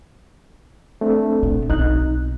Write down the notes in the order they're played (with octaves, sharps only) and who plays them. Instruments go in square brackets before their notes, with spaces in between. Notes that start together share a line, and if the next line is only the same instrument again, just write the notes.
[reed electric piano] A3 C4 D4
[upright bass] A#2 B3
[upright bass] B1 C4 [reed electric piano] D#4 F#6